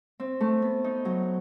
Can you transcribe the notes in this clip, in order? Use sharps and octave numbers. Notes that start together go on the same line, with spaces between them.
C4
A3
B3
D#4
F#3